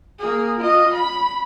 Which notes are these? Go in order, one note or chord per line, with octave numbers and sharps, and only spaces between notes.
A#3 G#4
F4 D#5
B5